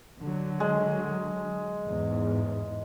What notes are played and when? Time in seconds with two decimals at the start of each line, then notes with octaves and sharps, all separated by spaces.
0.20 D3 F#3
0.60 G#3
1.86 E2 G#2